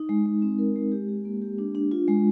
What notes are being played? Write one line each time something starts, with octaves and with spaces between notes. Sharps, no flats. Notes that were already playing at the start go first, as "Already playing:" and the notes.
Already playing: D#4
G#3
G#3
C4
A#4
G#3
G4
G4
A#3
G4
D4
D4
F4
G#3